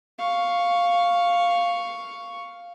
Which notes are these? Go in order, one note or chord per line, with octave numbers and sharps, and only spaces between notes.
F5 C#6